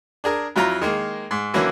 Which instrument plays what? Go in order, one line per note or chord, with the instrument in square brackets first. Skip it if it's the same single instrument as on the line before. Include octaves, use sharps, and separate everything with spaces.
[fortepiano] D4 G#4 A#4
F2 F#3 E4 F4 A#5
D#3 G#3 A#3
G#2
D3 E3 F#3 A#3 C#4 E4